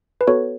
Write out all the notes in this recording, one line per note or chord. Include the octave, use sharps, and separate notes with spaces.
B4
B3 F#4 A4 C#5